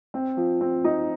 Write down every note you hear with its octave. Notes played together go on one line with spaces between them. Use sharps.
C4
F3
C4
D#4